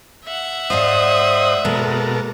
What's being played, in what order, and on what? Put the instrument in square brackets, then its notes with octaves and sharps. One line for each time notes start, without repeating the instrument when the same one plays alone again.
[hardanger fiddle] E5 F#5
[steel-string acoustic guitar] G#2 D5 F5 [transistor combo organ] C5 D#5 D#6
[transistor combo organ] B2 A4 A#4 [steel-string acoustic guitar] G#3 A#3